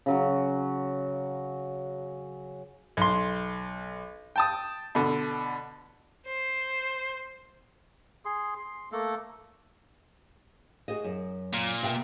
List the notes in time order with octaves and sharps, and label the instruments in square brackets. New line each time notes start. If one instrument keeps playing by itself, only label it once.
[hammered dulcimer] C#3 F#3 F#4
[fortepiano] B1 C6
G5 A5 D#6
B2 D3
[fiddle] C5
[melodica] G#4 C6
C6
A3 A#3 A4
[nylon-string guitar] F#4 G#4 D#5
F#2
[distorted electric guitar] A#2
[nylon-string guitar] B2 E5 G5